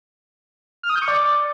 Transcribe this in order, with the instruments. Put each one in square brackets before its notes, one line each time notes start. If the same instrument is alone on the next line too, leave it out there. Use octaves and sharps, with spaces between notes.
[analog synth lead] F6
D#6
G6
C#6
D5